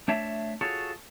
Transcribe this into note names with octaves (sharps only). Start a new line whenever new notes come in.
A3 D4 C#5 E5 A5
F4 F#4 G#4 A4 C#5